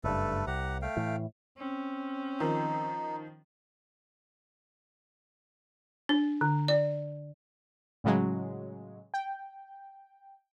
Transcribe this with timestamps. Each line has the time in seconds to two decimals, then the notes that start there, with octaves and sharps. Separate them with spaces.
0.04 F#1 G2 A3 A4 B4
0.47 C2 G4 F#5 A#5
0.82 A3 F5 G5
0.97 A2 E3
1.58 C4 C#4
2.40 D#3 F3 D#4
6.09 D4
6.41 D3
6.68 D5
8.04 A2 C#3 F#3 G#3
9.14 G5